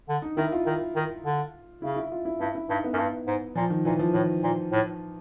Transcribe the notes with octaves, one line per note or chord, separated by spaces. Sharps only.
D3
D#4
D#3 E4
F4
D#3
D#3
D3
C#3 E4
E4
F4
E4
G2 E4
E4
G2 D#4
B3
F#2
G2
G#2
A#2 F3
D#3
A#2 E3
F3
A2 D#3
A#2
A2